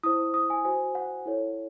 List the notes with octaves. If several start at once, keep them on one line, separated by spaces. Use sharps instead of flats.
E4 C5 D#6
D#6
G#5
F#4 C5 G#5
F#5
E4 A4 C#5